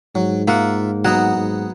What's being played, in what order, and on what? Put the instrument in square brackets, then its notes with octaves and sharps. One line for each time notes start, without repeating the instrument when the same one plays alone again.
[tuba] G#2 [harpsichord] F#3
[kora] A#3 F#5 [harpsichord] F4 E5
[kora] F#3 [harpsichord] B3 D#4 F#5
[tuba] G#2